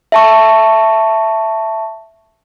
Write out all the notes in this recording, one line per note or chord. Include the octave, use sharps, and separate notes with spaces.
E5 A5 C#6